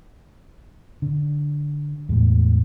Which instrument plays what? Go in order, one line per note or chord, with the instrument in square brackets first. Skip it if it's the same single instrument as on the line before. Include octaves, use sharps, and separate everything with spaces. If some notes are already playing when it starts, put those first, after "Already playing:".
[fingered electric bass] D3
E2 A2 G#3